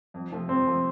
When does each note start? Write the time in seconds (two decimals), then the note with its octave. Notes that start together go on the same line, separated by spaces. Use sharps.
0.14 F2
0.31 C3 F3 A3
0.49 F2 C4
0.66 C3 F3 A3